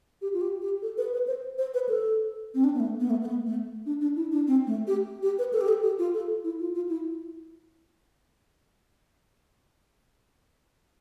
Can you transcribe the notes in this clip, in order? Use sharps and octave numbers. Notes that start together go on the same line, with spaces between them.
G4
F4
G4
G4
A4
B4
B4
C5
C5
B4
A4
C4
D4
B3
A3
B3
A3
A3
B3
A3
D4
D4
E4
D4
C4
A3
G4
G4
B4
A4
G4
A4
G4
F4
A4
E4
F4
F4
E4